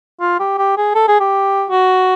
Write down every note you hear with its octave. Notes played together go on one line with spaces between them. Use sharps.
F4
G4
G4
G#4
A4
G#4
G4
F#4